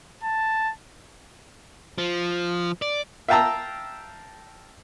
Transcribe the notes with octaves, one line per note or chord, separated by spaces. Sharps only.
A5
F3
D5
E5 F5 G5 A5 A#5 E6